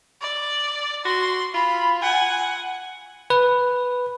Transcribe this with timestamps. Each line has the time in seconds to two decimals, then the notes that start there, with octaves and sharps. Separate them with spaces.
0.21 D5
1.05 F#4 C6
1.54 F4 B5
2.02 F#5 G#5
3.30 B4